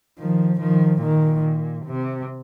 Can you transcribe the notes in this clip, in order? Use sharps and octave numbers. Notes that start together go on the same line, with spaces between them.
D#3 F3
D#3 F3
A#2 D#3
C3